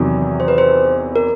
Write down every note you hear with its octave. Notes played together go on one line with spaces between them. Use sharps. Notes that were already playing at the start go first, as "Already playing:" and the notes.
Already playing: E2 C3 D#3 F#3
C5
B4
C5
A#4